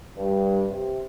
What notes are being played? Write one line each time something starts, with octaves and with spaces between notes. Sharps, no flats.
G2
C3